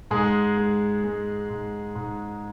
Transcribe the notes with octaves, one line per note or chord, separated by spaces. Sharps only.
G#2 G#3 G#4
G#3
G#3
G#2
G#2